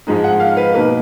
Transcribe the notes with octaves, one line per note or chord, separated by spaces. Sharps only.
G#2 F3 G#3 D#4
F#5
F5
B4
B2 A#3 D#4 B4